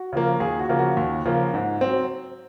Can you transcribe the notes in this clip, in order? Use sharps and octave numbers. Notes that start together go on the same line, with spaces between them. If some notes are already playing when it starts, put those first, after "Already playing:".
Already playing: F#4
C#3 F3 A#3
D#2 G#4
F#4
C#3 F3 A#3
F#4
D#2
C#3 F3 A#3
G#2
F#3 C4